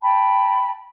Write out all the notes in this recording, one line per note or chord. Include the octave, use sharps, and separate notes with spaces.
G5 A5 B5